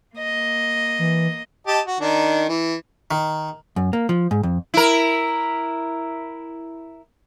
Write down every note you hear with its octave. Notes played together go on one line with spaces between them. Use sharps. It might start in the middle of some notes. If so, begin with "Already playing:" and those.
A#3 D#5
E3
G4 D#5 A5
F#4
D#3 D4 D#4
E3
D#3
F#2
A#3
F3
G#2
F2
E4 A#4